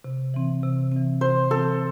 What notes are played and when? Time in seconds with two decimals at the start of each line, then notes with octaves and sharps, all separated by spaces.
0.04 C3
0.34 E3 C4
0.63 C3
0.92 E3 C4
1.21 C3 C5
1.50 E3 C4 A4